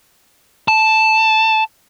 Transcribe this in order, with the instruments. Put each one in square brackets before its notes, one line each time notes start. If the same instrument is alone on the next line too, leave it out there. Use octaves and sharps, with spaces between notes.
[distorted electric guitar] A5